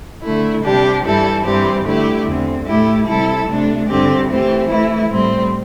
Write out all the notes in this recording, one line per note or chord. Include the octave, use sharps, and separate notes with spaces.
D3 A3 E4
C3 G3 D4 G4
G2 E3 G3 E4 A4
G2 E3 G3 C4 G4
D3 A3 E4 G4
E2 D3 C4
A2 A3 E4 G4
C3 G3 E4 A4
C3 A3 D4
G2 D3 C4 G4
E3 A3 C4 G4
E3 A3 E4
A2 G3 C4